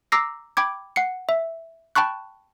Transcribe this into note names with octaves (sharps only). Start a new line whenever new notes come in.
A#5 D6 E6 A#6 C7
G5 B5 D6 G#6
F#5 C7 C#7
E5
G5 A5 B5 C#6 F#6